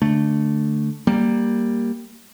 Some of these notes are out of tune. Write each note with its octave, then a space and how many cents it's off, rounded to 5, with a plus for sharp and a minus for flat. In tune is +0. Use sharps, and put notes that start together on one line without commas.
D3 +0 A3 +0
G3 +0 A#3 +0